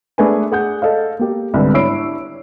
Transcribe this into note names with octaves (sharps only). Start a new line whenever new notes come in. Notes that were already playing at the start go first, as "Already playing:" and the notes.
A3 D4 G#4 A#4 B4 G#5
G#4 F#5 G6
A4 D#5 F5
A#3 G4
C2 G#2 D3 B3
D4 E4 C#5 E6 C7 D7